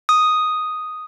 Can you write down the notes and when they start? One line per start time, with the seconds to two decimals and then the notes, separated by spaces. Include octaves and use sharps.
0.09 D#6